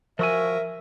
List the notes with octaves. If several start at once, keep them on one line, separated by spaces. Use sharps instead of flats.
F3 F#4 A#4 E5 G#5